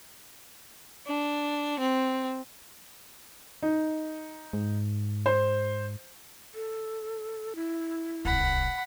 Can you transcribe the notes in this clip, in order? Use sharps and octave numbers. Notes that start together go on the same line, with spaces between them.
D4
C4
D#4
G#2
C5
A4
E4
D1 C2 F#5 B5